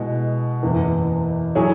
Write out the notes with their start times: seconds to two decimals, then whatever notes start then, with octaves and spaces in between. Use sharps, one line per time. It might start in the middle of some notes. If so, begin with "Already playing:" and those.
Already playing: B2 G#3 E4
0.63 F#1 E2 E3
1.55 F#3 E4 G#4 C#5